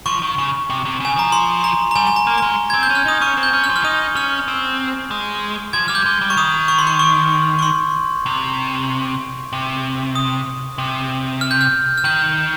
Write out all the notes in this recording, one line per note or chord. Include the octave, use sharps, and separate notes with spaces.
F3 C#6
D#3
C#3
C3
C3
C#3 G#5
F3 A#5
C6
A#5
A#5
G3 G#5
G#5
A#5
A#3
G#3 A#5
C4 G#6
G6
C#4 F6
D#4 D#6
C#4 C#6
C4
G6
C#4
F6
F3
F6
D#4 D#6
C#4 F6
C4
G#3
F3 G#6
G3 F6
G6
G#3
G3
C#6
D#3 D#6
C#6
C6
C#6
C#6
C#6
C6
C3
C3
D#6
C3
F6
G6
F6
F6
D#3 G6